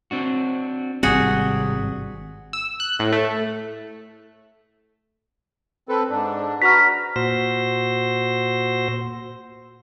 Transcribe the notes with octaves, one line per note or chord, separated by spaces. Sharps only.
C4 D4 F#4
G#1 G2 C3 G3 C4 F#4 G#4
E6
F#6
A2
A3
C4 A4 B4
G#2 D4
F#4 B4 A#5 F6 B6
A#2 F#4 C5 C6 E6 A#6